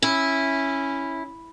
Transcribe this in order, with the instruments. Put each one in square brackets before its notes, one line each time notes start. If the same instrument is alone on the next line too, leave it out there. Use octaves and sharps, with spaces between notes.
[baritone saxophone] C#4 [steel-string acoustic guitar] E4